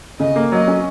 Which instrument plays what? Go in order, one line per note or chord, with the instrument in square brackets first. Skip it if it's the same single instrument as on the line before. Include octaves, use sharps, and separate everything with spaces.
[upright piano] C#3 [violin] D#5
[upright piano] A#3
[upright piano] F#3 [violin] D#5
[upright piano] C#4